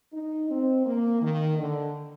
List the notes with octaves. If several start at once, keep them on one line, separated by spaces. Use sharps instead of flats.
D#4
C4
A#3
D#3
D3